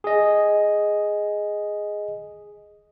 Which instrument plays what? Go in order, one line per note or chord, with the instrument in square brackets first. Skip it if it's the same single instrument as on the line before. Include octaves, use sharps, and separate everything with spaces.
[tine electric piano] G#4 D#5